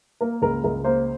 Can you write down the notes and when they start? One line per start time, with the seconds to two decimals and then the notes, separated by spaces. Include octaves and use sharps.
0.21 A#3 A#4
0.42 C#2 A#4
0.64 C#2 A#4
0.84 A#3 C5